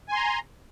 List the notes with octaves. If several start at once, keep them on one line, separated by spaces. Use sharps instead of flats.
G#5 A#5 C6